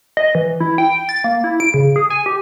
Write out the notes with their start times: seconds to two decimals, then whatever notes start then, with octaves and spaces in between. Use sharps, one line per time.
0.17 D#5
0.35 E3
0.60 E4
0.78 G5
1.09 A6
1.24 A#3
1.44 E4
1.60 D7
1.74 C#3
1.96 G#4
2.10 G#5
2.26 G4